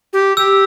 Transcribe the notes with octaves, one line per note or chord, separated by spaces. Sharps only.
G4
G4 E6